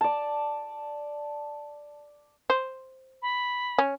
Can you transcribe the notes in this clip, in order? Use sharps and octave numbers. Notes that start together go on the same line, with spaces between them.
D5 A5
C5
B5
C#4